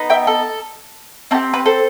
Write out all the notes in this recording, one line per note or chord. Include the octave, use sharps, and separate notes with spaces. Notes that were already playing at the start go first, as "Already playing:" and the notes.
Already playing: B3 D#4
E5 G5
A4
C4 D#4 G4 A4
B4
A4 C5